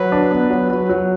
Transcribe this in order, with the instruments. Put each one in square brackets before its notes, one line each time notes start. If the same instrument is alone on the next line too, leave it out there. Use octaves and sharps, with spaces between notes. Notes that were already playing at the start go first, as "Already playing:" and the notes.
Already playing: [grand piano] F#3 [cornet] B4
[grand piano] D4
B3
F#3
[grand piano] F#3 [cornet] B4
[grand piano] F#3